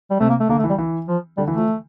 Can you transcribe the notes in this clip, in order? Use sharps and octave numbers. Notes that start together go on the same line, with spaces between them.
G3
C3 A3
A#3
A3
D3 A#3
A3
E3
G3
E3
F3
D3 G3
E3
F3 A3